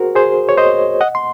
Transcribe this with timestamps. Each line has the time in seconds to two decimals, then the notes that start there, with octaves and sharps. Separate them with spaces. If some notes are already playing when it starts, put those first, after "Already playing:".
Already playing: F#4 G#4 A#4 C5
0.15 G#4 C5
0.49 C#5
0.57 C5 D#5
1.01 D#5 F#5
1.15 C6